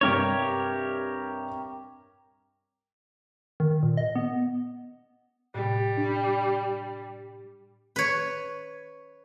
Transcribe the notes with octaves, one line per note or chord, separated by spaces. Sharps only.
G2 C3 G3 G4 A#4 C#5
D#3
A#2
D#5
B3
A2 C3 G3
D4
B4 C#5